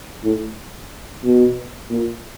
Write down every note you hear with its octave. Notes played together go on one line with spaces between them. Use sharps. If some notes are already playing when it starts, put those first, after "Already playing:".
A2
B2
A#2